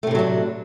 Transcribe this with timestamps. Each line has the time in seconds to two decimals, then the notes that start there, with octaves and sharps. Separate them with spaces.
0.03 A3
0.07 C3
0.11 A2
0.15 F#3
0.19 D4